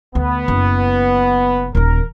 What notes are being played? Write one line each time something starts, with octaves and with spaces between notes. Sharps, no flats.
D2 B3
F#1
D#1 D#3 A#4